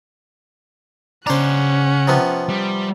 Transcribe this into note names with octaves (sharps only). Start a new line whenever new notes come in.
C#3 C#4 D4 C5 F#5 A#5
C3 F3 B3
G3